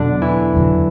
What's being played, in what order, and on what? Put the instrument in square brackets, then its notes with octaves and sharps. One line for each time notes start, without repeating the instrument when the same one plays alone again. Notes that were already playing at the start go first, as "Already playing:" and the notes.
Already playing: [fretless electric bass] E2 B2 F#3 [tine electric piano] D3 D4
[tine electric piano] E3 E4
[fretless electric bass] E2 D3 F#3